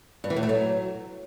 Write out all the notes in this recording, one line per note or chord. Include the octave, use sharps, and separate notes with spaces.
G2
E3
A2
A3
F#3